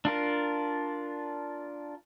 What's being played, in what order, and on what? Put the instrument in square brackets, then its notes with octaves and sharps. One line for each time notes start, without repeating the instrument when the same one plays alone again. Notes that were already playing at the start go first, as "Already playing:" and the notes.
[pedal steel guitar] D4 F4 A#4